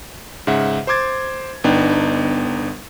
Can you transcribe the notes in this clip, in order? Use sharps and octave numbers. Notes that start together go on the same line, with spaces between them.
G#2 C#3 E5 F#5
C5 C6 D6 G#6 A6
G1 B3 D4 D#4 G5